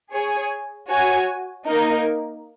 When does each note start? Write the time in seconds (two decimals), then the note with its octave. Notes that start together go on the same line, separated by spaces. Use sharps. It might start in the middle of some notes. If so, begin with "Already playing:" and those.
0.12 G#4 C#5 G#5
0.89 F#4 C#5 G#5
1.66 A#3 D#4 A#4